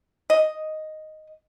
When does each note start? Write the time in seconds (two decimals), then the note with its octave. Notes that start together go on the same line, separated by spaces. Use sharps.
0.30 D#5